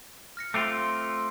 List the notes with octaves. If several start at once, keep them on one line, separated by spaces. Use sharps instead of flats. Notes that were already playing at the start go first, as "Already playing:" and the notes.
F6 A#6 C#7
A3 C4 F4 D6 F7